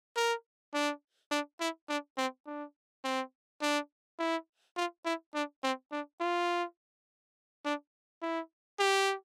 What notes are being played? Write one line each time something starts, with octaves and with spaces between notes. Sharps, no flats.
A#4
D4
D4
E4
D4
C4
D4
C4
D4
E4
F4
E4
D4
C4
D4
F4
D4
E4
G4